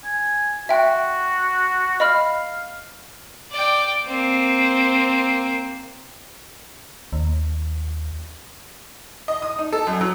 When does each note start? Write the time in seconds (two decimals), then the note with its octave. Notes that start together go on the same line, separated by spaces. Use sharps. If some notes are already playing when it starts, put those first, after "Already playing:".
0.04 G#5
0.69 F#4 E5 G5
2.00 D#5 F5 B5 F6
3.52 D5 G5
4.05 A#3 C4
7.13 D#2
9.28 D#5
9.42 D#6
9.59 D#4
9.73 A4
9.87 F#2
10.01 F#3